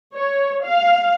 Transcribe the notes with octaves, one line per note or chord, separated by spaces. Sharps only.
C#5
F5